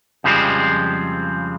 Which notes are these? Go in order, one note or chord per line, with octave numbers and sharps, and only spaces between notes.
F2 C#3 F3 G3 G#3 C4